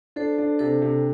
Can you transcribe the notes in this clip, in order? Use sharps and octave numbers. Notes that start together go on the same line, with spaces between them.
D4 A4 C5
D4
C3 A4 C5
C3